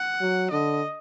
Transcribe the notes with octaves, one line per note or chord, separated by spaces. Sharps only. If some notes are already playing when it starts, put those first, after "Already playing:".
Already playing: F#5
F#3
D3 D#5